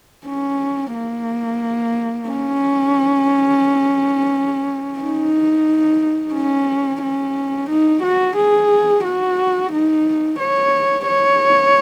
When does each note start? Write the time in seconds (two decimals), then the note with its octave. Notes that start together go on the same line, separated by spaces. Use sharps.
0.26 C#4
0.94 A#3
2.29 C#4
4.99 D#4
6.34 C#4
7.02 C#4
7.70 D#4
8.03 F#4
8.37 G#4
9.04 F#4
9.72 D#4
10.39 C#5
11.08 C#5